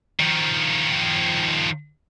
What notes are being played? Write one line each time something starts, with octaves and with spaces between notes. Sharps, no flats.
D#3 F3